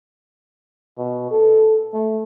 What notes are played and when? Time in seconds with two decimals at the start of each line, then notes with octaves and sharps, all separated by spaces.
0.98 B2
1.31 A4
1.94 A3